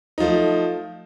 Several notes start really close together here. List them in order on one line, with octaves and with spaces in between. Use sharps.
D#4 F3 A3